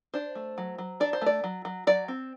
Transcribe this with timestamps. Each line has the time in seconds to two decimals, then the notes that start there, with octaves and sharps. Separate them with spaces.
0.14 D4 C5
0.35 A3
0.58 F#3
0.78 F#3
1.00 D4 D5
1.13 C5
1.21 A3 D5
1.44 F#3
1.65 F#3
1.87 F#3 D5
2.08 C4